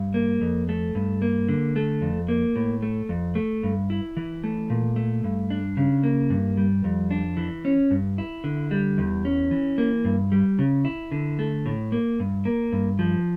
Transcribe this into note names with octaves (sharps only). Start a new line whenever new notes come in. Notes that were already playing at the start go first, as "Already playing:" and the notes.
Already playing: G2
A#3
F2
A3
G2
A#3
D3
A3
F2
A#3
A2
A3
F2
A3
G2
E4
E3
A3
A#2
A3
G2
D4
C#3
A#3
G2
G3
F2
D4
E3
C#4
G2
E4
D3
G3
E2
C#4
E3
A#3
G2
G3
C#3
E4
D3
A3
A2
A#3
G2
A#3
G2
F3